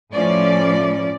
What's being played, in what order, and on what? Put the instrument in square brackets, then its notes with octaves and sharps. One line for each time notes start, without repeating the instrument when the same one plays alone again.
[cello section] A2 F3 C#4 D5